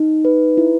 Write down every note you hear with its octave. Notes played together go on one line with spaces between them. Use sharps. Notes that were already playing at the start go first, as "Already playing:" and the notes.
Already playing: D#4
B4
E4